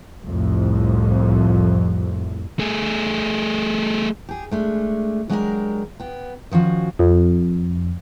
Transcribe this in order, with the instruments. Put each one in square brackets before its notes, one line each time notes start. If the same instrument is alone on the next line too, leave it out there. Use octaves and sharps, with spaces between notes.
[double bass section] C2 F2 A2
[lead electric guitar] A3 G#4
[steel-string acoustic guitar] G4 G#4
G#3 A3 D4
F#3 G#3 D4 E4 G4 A#4
B3 G5
D#3 F3 C#4 F#4
[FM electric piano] F2